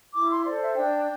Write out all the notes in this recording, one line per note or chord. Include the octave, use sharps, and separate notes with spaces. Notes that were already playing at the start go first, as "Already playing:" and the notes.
E4 D6
C6
A4 C5 D5
E5
D4 G5